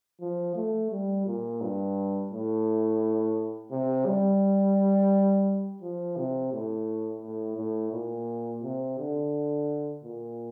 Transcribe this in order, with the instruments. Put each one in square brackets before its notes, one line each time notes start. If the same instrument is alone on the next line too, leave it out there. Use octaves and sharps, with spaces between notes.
[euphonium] F3
A3
G3
A#2
G2
A2
C3
G3
F3
C3
A2
A2
A2
A#2
C3
D3
A#2